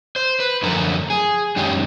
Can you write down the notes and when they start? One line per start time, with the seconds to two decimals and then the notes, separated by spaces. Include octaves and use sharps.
0.16 C5
0.40 B4
0.62 F#2 D3 F3 A3 A#4
1.10 G#4
1.56 F#2 D#3 G#3 C#4 G4